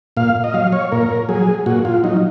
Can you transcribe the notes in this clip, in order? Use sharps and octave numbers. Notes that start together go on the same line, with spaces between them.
A#2 F5
D#5
F#3 F5
C#5
A#2 A#4
F#3 G#4
A#2 F#4
F4
F#3 D#4